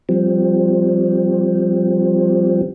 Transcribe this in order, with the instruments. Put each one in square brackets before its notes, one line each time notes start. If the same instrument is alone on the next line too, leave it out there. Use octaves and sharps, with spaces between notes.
[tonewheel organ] F3 G3 C4